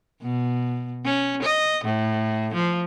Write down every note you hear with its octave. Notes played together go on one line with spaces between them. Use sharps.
B2
C#4
D#5
A2
F3